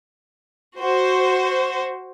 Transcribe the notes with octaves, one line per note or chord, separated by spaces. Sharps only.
F#4 C5